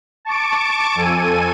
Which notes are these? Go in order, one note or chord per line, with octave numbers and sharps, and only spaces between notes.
A5 C#6 D6 D7
F2 A4 G#5 D#7